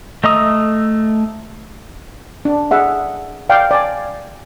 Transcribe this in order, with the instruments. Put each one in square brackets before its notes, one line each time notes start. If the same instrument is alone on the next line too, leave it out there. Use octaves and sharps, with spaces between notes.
[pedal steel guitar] A3 D#5 A#5 D#6 E6
[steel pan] D4
G#4 E5 F#5
D5 F5 G5
D5 G#5